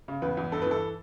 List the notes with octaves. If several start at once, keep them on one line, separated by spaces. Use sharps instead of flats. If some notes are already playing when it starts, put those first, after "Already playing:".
C#3
E2 B4
E2
G2 A4
B4
E3 A4